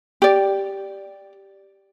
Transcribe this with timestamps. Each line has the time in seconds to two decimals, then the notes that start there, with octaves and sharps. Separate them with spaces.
0.22 G4 D5